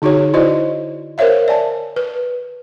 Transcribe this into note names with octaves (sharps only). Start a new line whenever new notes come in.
D3 D#4 F#4 G#4 C#5
E4 F#4 C5 D5 D#5
A#4 C5 C#5 E5 F5
D5 G#5 A5
B4